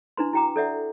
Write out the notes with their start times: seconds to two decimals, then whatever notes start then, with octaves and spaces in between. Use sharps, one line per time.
0.17 D4 E4 B4 C6
0.33 E4 F#4 G5 A#5 D6
0.56 A4 D5 E5 F#5